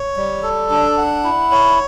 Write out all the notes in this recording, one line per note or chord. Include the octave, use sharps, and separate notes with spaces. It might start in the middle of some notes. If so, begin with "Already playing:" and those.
Already playing: C#5
G3
A4
D4
F#5
E4
C#5